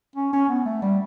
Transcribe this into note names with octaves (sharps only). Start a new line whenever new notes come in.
C#4
C#4
B3
A3
G3